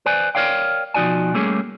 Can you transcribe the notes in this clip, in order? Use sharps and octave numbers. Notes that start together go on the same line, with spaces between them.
B4 C5 D5 G#5
A#4 B4 C#5 D5 F5 G5
B2 F3 D#4 F#4 D5 G#5
G3 A3 A#3 C#4 G#4